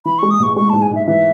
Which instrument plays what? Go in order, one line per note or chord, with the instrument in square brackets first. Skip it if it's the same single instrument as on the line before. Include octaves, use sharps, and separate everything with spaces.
[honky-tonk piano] E3 [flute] B5
[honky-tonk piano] G#3 [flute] C#6
[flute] D#6
[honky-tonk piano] A1 [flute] C#6
[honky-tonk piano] G#3 [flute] C#6
[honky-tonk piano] G#2 [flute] A5
[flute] G#5
[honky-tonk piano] G#2 [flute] E5
[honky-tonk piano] E3 [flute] E5